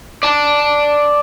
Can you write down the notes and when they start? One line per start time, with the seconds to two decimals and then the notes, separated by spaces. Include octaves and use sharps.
0.23 D5 A5